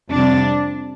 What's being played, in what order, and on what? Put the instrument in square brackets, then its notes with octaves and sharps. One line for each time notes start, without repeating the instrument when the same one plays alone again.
[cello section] F2 C3 G3 D4